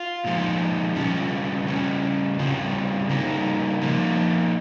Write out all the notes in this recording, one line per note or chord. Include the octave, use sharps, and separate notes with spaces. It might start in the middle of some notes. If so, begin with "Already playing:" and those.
Already playing: F4
A#2 F3 G#3 D#4
C#3 G3 C#4 F4
C#3 G3 C#4
C#3 G3 C4 F4
C#3 G3 A#3 D#4
F3 A#3 D#4